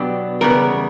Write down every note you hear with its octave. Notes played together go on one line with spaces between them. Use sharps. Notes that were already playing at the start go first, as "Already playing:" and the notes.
Already playing: B2 F#3 B3 D4 G4
E2 C#3 G3 B3 A#4